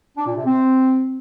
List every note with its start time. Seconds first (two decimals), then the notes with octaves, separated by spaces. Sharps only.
0.17 D4
0.27 A#2
0.36 C3
0.46 C4